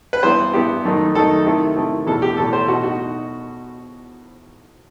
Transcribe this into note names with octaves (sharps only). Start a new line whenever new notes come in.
B4
G2 E3 B3 E4 C5
G2 E3 B3 E4 G4
F#2 D#3 A3 D#4
F#2 D#3 A3 D#4 A4
C3 D#3 A3 E4
C3 D#3 A3 E4
E2 B2 A3 A4
G4
E2 B2 A3 A4
C5
B2 A3 D#4 F#4
F#4
D#4